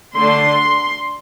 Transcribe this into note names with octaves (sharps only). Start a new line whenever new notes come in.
D3 A3 D4 C6